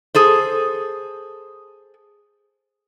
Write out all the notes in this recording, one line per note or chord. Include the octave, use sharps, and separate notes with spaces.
G#4 A4 C5